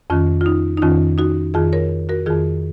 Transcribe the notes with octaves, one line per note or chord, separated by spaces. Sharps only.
F2 D#3 C#4 F4
F4
D#4
D#4
F2 D#3 C#4 F4
D#4 F#4
F2 D#3 F4 G#4
A#4 C#5
F#4 A#4
F2 D#3 F4 G#4